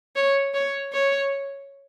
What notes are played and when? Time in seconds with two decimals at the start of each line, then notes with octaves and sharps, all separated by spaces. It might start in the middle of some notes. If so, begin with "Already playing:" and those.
0.16 C#5
0.54 C#5
0.93 C#5